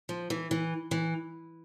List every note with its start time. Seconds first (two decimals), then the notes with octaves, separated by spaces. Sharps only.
0.09 F3
0.30 E3
0.51 E3
0.91 E3